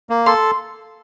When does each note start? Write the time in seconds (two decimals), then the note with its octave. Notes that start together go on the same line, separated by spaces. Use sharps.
0.10 A#3
0.26 A4 C6